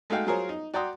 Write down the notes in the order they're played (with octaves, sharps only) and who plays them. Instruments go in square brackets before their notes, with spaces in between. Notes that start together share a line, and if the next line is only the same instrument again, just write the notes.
[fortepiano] G#3 A3 D#4 F#4 F5 G5
F#3 F4 G#4 A#4 C5 C#5
D#4
F#4 D5 G5 A#5 C6 D#6